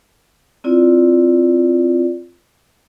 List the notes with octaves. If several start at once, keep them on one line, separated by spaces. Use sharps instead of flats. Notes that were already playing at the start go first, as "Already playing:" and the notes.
C4 E4 F4 D5